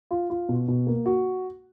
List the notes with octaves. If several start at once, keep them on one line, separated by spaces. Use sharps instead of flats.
F4
F4
B2
B2
A#3
F#4